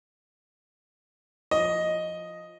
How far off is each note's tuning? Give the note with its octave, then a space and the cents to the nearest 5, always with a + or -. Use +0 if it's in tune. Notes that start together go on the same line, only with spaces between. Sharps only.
F3 +0 D#5 +0